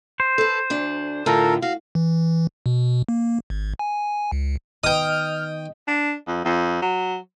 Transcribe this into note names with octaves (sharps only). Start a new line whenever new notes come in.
C5
A4 B4
D2 D4
A2 D3 F4 A4 A#4
F#4 F5
E3
B2
A#3
G#1
G#5
C#2
D#3 B3 B4 D#5 G5 D#6 F6
D4
F2
F2
F#3